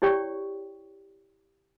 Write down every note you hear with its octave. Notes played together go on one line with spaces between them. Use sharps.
E4 G4 C#5 D5 G5 C#6